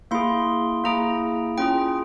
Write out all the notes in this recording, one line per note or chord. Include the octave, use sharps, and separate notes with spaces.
A#3 E4 G#4 C6
A#3 E4 G#4 A#5
C#4 F4 G#4 G5